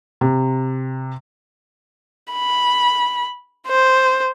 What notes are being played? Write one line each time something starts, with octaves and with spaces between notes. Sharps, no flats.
C3
B5
C5